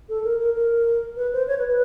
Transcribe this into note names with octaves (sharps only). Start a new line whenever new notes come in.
A4
A#4
A#4
A#4
B4
C5
C#5
B4
B4